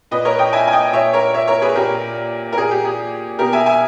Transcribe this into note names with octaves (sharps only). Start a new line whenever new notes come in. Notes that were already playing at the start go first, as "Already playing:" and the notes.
A#2 B4 D#5
A#4 C#5
D#5 G5
E5 G#5
G#5
D#5 G5
A#2 C#5 E5
A#4 C#5
C#5 E5
A#4 C#5
G#4 B4
A#2 G4 A#4
A#4
A#2 G#4
G4
G#4
B2 G4 A#4
E5 G#5
E5 G#5